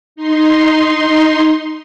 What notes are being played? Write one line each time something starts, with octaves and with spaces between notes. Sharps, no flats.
D#4 C6